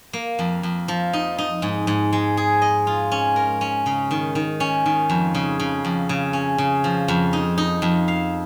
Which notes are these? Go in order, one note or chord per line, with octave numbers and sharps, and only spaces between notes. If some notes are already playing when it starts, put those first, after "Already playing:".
A#3
F2
F2
F3
D#4
D#4
G#2
G#2
G#3
G#4
D#5
F4
C#4
A#4
C#4
C#3
D#3
D#3
C#4
D#3
F2
C#3
C#3
F2
C#3
C#4
C#3
F3
F2
D#4
D#4
F2
F5